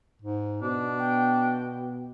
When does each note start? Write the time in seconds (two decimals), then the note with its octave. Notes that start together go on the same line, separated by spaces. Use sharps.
0.22 G#2
0.62 B2 B3 D4
0.99 G5